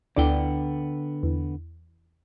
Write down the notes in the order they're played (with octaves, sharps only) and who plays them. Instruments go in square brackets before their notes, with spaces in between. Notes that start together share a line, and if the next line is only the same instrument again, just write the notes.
[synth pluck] D2 E4 D5 [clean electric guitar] D3 B3 G5
[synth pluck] E2